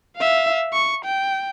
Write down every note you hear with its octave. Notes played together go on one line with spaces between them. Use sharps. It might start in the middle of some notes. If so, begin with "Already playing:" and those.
E5 F5
C#6
G5